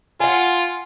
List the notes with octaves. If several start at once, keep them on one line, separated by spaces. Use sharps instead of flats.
F4 F#5 G#5